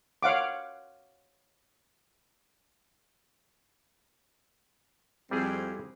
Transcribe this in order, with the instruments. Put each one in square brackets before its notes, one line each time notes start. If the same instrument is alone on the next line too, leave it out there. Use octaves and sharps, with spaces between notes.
[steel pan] C#5 F5 F#5 D6
[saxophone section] F2 C4 [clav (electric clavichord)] G3 E4 G#4